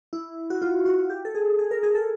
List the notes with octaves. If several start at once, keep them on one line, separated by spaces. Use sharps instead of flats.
E4
F#4
F4
F#4
G4
A4
G#4
G#4
A#4
G#4
A4